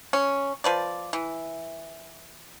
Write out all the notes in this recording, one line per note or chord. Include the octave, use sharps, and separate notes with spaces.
C#4
F3 B4 D5
E3